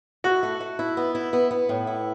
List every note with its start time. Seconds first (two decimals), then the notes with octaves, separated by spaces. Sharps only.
0.24 E4 F#4
0.43 A3
0.60 A3
0.79 E4
0.97 B3
1.15 E4
1.33 B3
1.51 B3
1.69 A2
1.87 E4